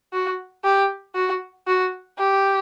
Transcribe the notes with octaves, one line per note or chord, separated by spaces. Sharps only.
F#4
G4
F#4
F#4
G4